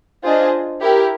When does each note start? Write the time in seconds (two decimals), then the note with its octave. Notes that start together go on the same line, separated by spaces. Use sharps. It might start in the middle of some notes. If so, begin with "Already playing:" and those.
0.24 D4 F4 G#4 C5 D#5
0.81 E4 G4 A#4